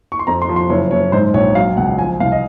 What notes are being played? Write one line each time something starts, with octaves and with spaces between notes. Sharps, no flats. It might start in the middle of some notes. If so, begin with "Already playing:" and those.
C#6
C6
F2 A#5
C6
F3
C6
F#1 C#5
F#1 C#5
G#2 C5
A#1 C#5
F#3 F5
C#2 F#5
F3 G#5
C2 F5
D#5